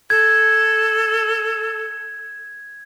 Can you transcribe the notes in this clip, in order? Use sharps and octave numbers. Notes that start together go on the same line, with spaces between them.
A4 G#6